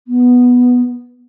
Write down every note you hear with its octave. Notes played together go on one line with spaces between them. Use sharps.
B3